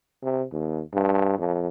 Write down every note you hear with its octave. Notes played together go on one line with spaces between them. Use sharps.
C3
D#2
G2
F2